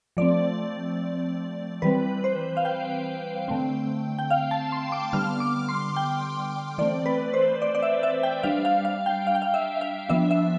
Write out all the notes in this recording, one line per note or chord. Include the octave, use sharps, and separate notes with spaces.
F3 A3 C4 D5
E3 G3 C4 B4
C5
F5
G5
D3 A3 C4
G5
F5
A5
C6
D6
D3 G3 B3 F6
D6
C6
G5
E3 A3 C4 D5
B4
C5
D5
D5
E5
E5
G5
G3 D4 F5
F5
F5
G5
F5
G5
F5
E5
F5
F3 B3 D4 E5
E5